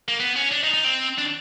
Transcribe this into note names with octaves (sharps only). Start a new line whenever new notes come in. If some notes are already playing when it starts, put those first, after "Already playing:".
A#3
B3
C#4
D4
D#4
D#4
C4
D4